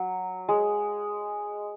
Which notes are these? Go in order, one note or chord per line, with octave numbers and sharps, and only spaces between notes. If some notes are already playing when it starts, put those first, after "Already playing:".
Already playing: F#3
G#3